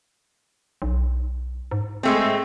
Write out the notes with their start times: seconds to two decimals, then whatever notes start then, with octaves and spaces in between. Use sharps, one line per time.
0.82 B1
1.71 G#2
2.03 G#3 A3 C4